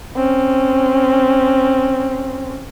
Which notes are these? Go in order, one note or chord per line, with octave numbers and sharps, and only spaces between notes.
C4 C#4